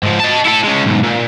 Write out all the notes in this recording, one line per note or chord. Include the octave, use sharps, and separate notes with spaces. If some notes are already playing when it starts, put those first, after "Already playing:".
G#2 F3
D#5 A5
E4 A4
G#3 C#4
B1 G#2
A#2